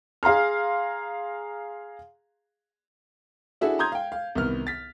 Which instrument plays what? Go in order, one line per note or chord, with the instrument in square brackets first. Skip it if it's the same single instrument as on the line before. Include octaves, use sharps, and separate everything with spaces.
[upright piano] G#4 F5 A#5 C6 F6
[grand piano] D4 E4 F#4 G#4 A4 E5
A#5 C6 D#6 G6 G#6
F5 G5
F5
C2 D#3 B3 F6
A6 B6